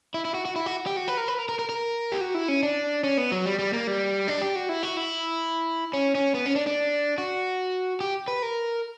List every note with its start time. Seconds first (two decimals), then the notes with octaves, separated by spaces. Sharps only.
0.14 E4
0.25 E4
0.34 F#4
0.45 F#4
0.56 E4
0.66 F#4
0.86 G4
0.96 F#4
1.08 B4
1.17 A#4
1.28 B4
1.38 A#4
1.49 A#4
1.59 A#4
1.69 A#4
2.12 G4
2.21 F#4
2.34 E4
2.48 C#4
2.63 D4
3.04 C#4
3.18 B3
3.32 F#3
3.46 G3
3.59 G3
3.73 A#3
3.87 G3
4.28 D4
4.42 G4
4.56 F#4
4.69 E4
4.83 F#4
4.97 E4
5.93 C#4
6.15 C#4
6.35 B3
6.46 C#4
6.56 D4
6.67 D4
7.18 F#4
8.01 G4
8.28 B4
8.43 A#4